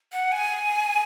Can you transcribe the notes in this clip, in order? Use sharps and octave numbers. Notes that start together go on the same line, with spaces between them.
F#5
G#5